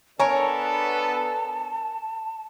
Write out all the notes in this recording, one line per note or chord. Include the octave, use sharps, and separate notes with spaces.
B3 D4 A4 A#4 C#5 G#5 A5